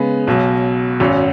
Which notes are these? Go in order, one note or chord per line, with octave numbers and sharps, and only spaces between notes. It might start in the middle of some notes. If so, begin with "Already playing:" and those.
Already playing: C#3 G#3 B3
B1 B2 F#3
G#1 F#2 F#3 C#4